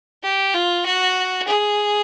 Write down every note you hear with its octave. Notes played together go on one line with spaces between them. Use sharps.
G4
F4
F#4
G#4